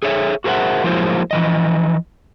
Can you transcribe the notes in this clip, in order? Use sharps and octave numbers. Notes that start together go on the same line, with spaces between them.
G#4 A4 C#5 E5
F#4 G#4 A#4 C5 E5 F#5
F3 F#3 G#3 A#3 E4 C5
E3 F3 D#5